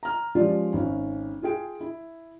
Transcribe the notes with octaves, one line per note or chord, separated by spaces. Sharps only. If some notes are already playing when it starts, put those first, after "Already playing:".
A#5 F6
F3 G#3 C#4 F4 G4 D5
G#1 C#4
F4 G#4 G5 D7
E4